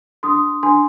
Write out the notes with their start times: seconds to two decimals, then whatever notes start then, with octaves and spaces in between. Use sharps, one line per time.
0.23 D4 C6 D#6
0.63 D4 G#5 C6